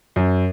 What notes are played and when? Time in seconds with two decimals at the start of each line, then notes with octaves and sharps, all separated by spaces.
0.16 F#2